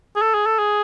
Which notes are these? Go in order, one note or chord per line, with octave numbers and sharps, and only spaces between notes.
G#4
A4
G#4
A4
G#4